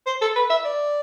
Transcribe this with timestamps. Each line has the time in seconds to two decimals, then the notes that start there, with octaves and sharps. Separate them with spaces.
0.06 C5
0.21 A4
0.36 B4
0.50 E5
0.65 D5